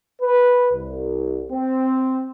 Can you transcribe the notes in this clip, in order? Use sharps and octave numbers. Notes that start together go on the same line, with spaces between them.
B4
C2
C4